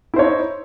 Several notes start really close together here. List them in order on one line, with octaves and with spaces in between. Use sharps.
E4 C5 C#5 D#4